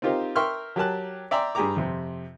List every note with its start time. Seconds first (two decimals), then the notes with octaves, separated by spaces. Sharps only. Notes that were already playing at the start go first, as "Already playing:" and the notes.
0.02 C4 D#4 F4 G4 A#4 C5
0.36 A#4 E5 G5 C6 C#6 F6
0.76 F#3 G4 A#4 A5 F#6
1.31 D5 E5 G5 A#5 C6 D6
1.55 G2 G4 G#4 G5 A#5 D6
1.77 F2 C3